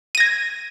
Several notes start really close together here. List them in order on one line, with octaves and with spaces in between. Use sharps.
D#7 A#6 G#6